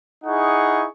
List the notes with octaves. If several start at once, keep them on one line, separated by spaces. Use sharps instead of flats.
D#4 E4 G#4 F#5 C#6